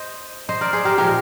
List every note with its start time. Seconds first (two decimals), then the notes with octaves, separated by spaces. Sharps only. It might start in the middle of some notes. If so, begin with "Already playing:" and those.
Already playing: C5 D#5
0.49 C5 D#5
0.61 A#4 D5
0.73 G#4 C5
0.85 G4 A#4
0.98 A#2 F3 G#3 G4 A#4